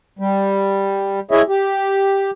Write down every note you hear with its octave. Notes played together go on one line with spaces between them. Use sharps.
G3
E4 G#4 C#5 D#5 E5
G4